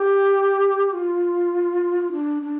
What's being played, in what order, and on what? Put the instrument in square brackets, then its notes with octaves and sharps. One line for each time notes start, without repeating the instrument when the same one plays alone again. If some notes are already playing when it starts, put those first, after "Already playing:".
Already playing: [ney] G4
F4
D4
D4